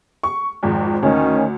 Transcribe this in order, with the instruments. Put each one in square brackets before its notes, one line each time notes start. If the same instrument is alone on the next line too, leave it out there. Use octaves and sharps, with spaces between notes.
[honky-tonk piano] C#6
G#1 F2 G#2
[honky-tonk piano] D2 [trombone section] D#3 C#4